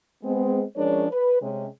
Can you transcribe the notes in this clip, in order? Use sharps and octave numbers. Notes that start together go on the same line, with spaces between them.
G#3 B3 C4
F3 G#3 C#4 D4 A#4 C#5
B4
C3 G#3 C#4